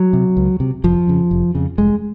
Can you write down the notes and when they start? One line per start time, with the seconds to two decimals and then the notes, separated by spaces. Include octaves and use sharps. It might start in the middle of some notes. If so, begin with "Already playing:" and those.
Already playing: F#3
0.13 C3
0.37 C#2
0.60 C3
0.84 F1 F3
1.07 F2 C#3
1.31 F1
1.55 F2 C#3
1.78 F1 G#3